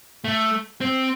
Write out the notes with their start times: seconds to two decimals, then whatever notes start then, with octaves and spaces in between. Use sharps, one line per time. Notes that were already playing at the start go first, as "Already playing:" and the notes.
0.24 A3
0.81 C4